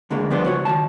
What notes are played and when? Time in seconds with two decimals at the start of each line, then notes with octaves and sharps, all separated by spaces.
0.10 D2 D3 G#3 A#3
0.30 F3 G3 B3 D4 C5
0.45 C#2 F#4 C#5
0.65 D#3 F#3 A5